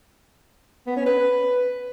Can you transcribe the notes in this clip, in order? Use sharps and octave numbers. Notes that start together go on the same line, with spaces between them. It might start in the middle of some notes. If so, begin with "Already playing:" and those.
B3
C#4
B4